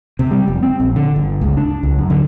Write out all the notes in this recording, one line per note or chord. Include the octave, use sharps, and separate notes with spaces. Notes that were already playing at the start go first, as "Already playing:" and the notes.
C3
G3
F1
C4
A#1
D3
G1
C#2
D4
C#2
F#2
D3